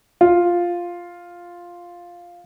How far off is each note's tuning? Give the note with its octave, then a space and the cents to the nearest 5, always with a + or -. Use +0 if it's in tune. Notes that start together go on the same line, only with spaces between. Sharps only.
F4 +0